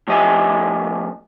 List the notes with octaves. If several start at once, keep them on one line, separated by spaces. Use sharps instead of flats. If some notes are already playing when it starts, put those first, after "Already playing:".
A2 F3 G4 D#5 E5 G#5